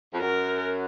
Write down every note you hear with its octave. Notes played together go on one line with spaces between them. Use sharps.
F2
F#2 A#4